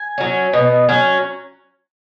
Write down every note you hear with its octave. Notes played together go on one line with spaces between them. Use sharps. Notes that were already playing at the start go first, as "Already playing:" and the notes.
Already playing: G#5
F#3 C#4
B2
F#3 C#4